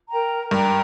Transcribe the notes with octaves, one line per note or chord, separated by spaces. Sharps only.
A#4 G5 A#5
G2 A#4 G5 A#5